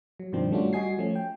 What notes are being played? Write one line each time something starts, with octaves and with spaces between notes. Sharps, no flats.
F#3
G2 B2 D#3 F3 C4 D4
G3 A3 C#4 D4 F4 F#4
G3 F#4 D#5 G#5 G#6 C7
F3 A3 C#4
G5